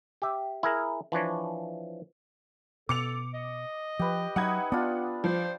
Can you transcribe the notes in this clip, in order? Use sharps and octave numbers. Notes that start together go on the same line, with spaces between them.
G4 E5
E4 G#4 A#4
E3 F3 D4 C#5
B2 A4 D6 C#7 F7
D#5
F3 G4 B4
F#3 D#4 E5 F#5 B5 D#6 G#6
B3 D4 F4
F3 C5